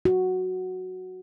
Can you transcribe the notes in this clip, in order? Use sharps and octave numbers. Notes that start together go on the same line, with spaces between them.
F#4